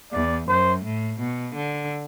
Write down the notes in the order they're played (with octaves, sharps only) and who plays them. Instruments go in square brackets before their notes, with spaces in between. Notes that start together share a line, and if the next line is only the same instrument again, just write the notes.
[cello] E2 [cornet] D5
[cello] F#2 [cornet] C5
[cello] A2
B2
D3